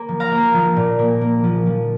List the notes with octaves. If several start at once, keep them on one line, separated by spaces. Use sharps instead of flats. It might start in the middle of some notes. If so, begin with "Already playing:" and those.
Already playing: A#3
F3
F5 A#5
A#3
F3
A#2
A#3
A#3
F3
F3